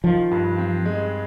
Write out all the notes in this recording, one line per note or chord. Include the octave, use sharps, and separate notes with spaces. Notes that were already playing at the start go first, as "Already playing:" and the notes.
D#3 F3
G2
C4
G#3